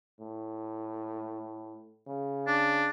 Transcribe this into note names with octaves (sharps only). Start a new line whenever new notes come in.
A2
C#3
D4